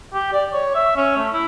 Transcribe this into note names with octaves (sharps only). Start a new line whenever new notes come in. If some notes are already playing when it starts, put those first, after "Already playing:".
G4
D5
C#5
E5
C#4
A3
E4